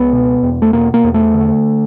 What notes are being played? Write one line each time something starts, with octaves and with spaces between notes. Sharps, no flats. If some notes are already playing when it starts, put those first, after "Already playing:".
Already playing: C#2 B3
B2
E2
A3
B2 A#3
A#3
E2
A3
D3